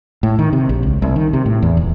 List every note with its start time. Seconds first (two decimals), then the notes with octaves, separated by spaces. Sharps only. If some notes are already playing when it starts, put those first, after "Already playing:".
0.23 A2
0.39 D#3
0.53 C3
0.69 A#1
0.83 C#2
1.02 C2
1.16 D#3
1.33 C3
1.46 A2
1.62 E2
1.77 D#1